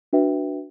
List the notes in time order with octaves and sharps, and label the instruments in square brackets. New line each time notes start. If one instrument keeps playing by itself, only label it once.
[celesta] D4 F#4 B4 E5 G5